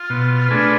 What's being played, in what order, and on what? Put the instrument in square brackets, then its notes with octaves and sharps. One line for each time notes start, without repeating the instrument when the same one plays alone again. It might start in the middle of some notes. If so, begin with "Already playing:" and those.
Already playing: [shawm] F4
[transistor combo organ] B2
A3 D4 G#4 B4